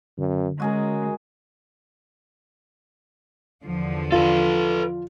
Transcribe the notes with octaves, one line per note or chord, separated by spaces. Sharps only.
F#2 D3
G#3 C#4 F#4 G#4 A#4
E2 D3 F3
F4 A4 B4